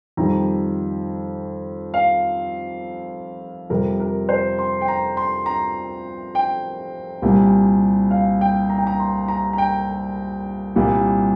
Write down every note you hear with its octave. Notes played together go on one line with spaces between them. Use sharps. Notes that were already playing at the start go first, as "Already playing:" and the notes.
F2 D#3 G3 A#5
F5
F2 C3 G3 A#4
A#4
C5
C6
G5
A#5
C6
A#5
G5
C2 A#2 G3
F5
G5
A#5
G5
A#5
C6
A#5
A#5
G5
C2 A#2 G3